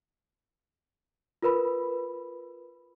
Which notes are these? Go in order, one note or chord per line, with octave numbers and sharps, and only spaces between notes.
F4 A#4 B4 B5